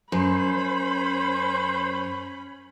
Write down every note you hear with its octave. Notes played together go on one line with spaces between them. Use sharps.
F#2 C#4 C5 B5